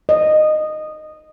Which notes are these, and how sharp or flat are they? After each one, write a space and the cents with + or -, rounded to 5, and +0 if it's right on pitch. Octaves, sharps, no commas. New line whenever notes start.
D#5 -15